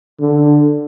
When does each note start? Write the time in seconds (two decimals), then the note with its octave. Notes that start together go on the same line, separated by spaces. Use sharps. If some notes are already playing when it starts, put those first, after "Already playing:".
0.21 D3